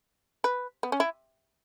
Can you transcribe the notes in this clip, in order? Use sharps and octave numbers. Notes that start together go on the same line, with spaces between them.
B4
B3
C#4
E4